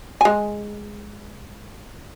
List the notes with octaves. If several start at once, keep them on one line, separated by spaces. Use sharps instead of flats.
G#3 G#5